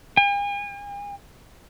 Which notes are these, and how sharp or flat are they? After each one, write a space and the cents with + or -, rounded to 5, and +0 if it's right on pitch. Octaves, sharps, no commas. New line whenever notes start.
G#5 -45